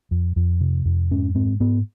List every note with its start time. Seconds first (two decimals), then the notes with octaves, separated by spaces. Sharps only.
0.11 F2
0.36 F2
0.61 C3
0.85 F2
1.11 G#2 C#4
1.35 G#2 C4
1.60 G#2 B3